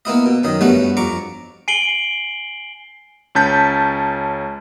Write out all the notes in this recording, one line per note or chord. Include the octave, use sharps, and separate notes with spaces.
A#3 B3 E4 D#5
B2
F#2 D#3 D#5
G2 A3 B3 C#4 F#4
F2 A#5 C#6 D6
G#5 C7 D7 F#7 G7
C#2 C#4 A5 G6 B6